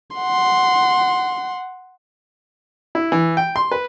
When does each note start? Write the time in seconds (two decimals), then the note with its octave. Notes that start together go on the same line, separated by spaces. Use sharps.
0.17 F#5 C6
2.95 E4
3.12 E3
3.37 G5
3.56 C6
3.71 B4